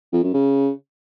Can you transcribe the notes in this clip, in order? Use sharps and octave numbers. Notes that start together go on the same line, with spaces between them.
F2
F#2
C#3